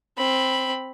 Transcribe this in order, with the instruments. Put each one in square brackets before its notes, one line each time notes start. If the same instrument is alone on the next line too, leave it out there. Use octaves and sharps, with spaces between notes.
[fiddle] C4 B5